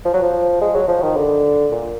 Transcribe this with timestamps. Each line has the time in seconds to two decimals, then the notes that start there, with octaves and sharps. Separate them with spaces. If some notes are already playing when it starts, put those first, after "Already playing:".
0.05 F3
0.14 F#3
0.23 F3
0.61 G#3
0.75 F#3
0.88 F3
1.02 D#3
1.16 D3
1.72 A#2